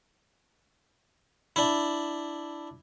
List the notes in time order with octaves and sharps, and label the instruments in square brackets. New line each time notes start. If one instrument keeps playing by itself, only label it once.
[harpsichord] D4 E4